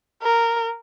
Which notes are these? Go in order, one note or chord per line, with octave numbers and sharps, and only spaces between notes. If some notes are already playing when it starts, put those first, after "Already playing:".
A#4